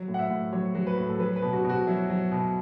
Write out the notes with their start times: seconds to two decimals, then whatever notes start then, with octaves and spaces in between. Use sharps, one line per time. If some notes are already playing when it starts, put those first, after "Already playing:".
Already playing: F#3
0.08 A2
0.14 F#5
0.19 E5
0.30 A2
0.53 F#3 C#5
0.75 F#3
0.87 B4
0.98 A2
1.09 A4
1.19 F#3 B4
1.36 B4
1.42 B2
1.53 F#4
1.64 B2 F#4
1.86 F#3 E4
2.10 F#3
2.32 B2